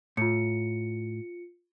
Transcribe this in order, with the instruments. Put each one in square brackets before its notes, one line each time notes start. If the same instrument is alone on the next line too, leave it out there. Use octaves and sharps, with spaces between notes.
[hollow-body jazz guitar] A2 [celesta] F4 C#7